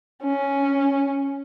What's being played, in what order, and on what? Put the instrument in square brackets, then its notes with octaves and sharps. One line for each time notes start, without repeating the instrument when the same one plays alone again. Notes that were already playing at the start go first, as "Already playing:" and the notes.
[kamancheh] C#4